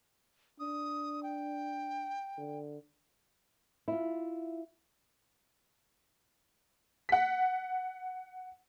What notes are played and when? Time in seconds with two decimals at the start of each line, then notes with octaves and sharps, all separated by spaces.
0.60 D4 D#6
1.23 G5
2.38 D3
3.88 E4 F4
7.09 F#5 B6